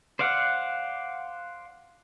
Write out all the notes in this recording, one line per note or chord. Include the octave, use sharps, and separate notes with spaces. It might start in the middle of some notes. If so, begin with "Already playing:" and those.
C5 D5 F5 F#5